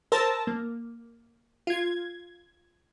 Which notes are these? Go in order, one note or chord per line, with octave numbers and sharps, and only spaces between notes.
A#4 C5 A5 E6 A6 A#6
A#3
F4 G#6